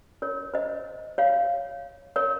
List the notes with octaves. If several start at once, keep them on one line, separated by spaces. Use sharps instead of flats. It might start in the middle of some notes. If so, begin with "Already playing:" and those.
A#4 C#5
C5 D#5
C#5 F5
A#4 C#5